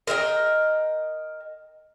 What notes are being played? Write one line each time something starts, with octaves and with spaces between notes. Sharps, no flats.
A#4 D#5 E5 G5